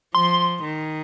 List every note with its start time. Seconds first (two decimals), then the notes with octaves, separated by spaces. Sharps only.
0.15 F3 C6
0.63 D#3